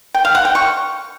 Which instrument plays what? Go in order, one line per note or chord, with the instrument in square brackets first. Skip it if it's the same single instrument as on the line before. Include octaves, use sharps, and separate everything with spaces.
[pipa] G5
F5
F#5
G5
C#6